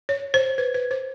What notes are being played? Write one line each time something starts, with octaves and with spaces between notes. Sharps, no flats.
C#5
C5
B4
B4
C5